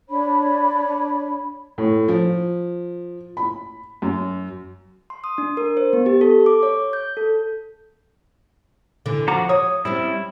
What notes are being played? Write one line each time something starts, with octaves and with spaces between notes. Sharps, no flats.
D4 C#5 B5
A2
F3
B5
F#2
C6
D#6
D4
A#4
C5
B3
G4
A4
D6
C#5
G6
A4
D3 E3
F3 F#4 A#5 D6
C#5 D#6
G3 C4 C#4 E4